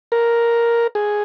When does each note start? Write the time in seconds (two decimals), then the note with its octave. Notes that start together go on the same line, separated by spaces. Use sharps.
0.12 A#4
0.95 G#4